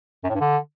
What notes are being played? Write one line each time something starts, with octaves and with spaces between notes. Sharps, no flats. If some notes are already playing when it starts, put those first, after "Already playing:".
F#2
A2
G2
D3